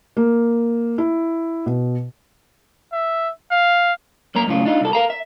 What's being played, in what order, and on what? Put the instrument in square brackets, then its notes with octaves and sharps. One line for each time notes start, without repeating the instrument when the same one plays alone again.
[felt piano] A#3
E4
B2
[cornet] E5
F5
[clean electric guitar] F#2 A#3 A#5
F#2 A2 C#3 F4
D4 D#4 F4
C2 A4
A#4 F5 A#5
E5